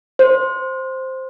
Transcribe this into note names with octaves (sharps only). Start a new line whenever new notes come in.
C5